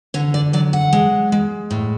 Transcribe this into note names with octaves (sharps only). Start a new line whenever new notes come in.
D3 C#5
D5
F#3 D5
F#5
G#3
G#3
A2